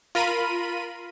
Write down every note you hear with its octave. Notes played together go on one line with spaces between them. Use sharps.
F4 A#4 B5 D#7